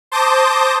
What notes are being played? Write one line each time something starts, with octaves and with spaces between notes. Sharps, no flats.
C5 A5 D6 D#6 G6 A#6